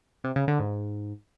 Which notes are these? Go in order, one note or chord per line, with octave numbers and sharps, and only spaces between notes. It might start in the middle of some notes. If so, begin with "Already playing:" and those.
C3
C#3
D3
G#2